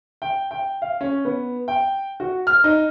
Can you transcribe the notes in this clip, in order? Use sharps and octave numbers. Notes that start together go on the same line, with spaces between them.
G5
G5
F5
C#4
B3
G5
F#4
F6
D#4